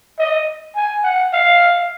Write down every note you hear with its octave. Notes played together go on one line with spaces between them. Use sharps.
D#5
G#5
F#5
F5